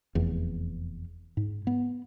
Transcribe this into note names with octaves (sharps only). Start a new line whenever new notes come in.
F1 E2
G#2
B3